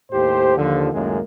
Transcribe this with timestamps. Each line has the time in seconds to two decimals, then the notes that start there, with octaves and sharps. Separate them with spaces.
0.11 D#2 A2 G4 C5
0.58 D#2 D3 F3
0.92 C#2 F#2 A2 D#3 G#3 A#3